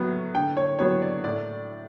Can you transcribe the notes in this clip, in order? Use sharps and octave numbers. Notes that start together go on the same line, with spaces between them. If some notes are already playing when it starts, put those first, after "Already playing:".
Already playing: A2 F#3 B3
D3 G5
C#5
F#3 B3 C#5
D5
A2 D5